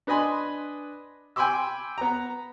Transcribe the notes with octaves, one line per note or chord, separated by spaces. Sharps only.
D4 B4 D#5 G#5 B5 C6
G5 G#5 B5 C6 D6 E6
B3 A#5